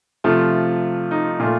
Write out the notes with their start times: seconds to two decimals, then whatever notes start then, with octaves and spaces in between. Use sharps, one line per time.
0.24 C3 F3 A3 F4
1.11 D#4
1.39 A#2 A3 F4